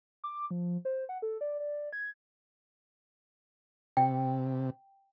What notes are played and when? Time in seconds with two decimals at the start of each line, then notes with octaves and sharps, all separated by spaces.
0.24 D6
0.51 F3
0.85 C5
1.09 F#5
1.22 A4
1.41 D5
1.60 D5
1.93 G#6
3.97 C3 G5